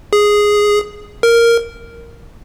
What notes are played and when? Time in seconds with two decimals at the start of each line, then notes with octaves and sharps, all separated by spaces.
0.13 G#4
1.23 A#4